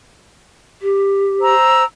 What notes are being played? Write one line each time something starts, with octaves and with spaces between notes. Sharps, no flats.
G4
C5 A#5 E6